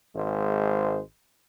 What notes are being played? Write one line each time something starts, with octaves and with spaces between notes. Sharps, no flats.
G#1 G#3 C5